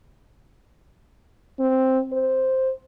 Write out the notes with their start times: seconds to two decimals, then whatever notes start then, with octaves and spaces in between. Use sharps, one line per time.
1.60 C4
2.13 C5